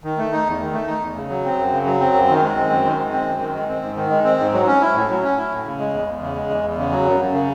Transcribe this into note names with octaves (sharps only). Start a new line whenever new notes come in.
D#3
A3
D#4
E2
D#3
A3
D#4
E2
C#3
F#3
C4
F#2
C#3
F#3
C4
F#2
D#3
G#3
C4
F#2
D#3
G#3
C4
F#2
D#3
G#3
C4
G#2
D#3
G#3
C4
G#2
F#3
C#4
E4
A2
F#3
C#4
E4
A2
C#3
G#3
E2
E2
C#3
G#3
E2
E2
C#3
F#3
F#2
F#2
C#3